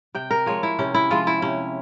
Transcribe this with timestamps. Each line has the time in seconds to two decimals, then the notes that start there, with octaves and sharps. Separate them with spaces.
0.15 C3 G5
0.31 A#4
0.46 F3 G#3 C#5
0.63 E4
0.79 C3 C#4
0.94 E4
1.10 F3 G#3 F4
1.27 E4
1.42 C3 C#4